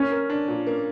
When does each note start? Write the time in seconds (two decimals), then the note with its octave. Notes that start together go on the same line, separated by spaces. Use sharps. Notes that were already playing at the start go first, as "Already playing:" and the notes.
Already playing: A#3 C#4
0.12 A#4
0.30 D4
0.48 A#2
0.67 A#3